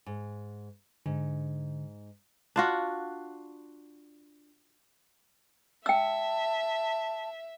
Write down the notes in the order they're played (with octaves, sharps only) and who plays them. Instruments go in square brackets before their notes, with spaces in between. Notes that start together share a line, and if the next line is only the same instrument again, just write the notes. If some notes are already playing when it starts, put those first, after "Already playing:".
[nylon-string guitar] G#2
[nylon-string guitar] G#2 [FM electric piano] D3
[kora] D4 F4 F#4
[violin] E5 [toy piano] G5 E6 [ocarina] A5